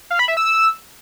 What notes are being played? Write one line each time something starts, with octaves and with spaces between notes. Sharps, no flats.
F5
B5
E5
E6